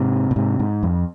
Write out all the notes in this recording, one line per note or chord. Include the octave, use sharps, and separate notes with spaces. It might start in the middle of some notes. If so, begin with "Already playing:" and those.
Already playing: G#2 C3
A#2
G#2 C3
G#2
F2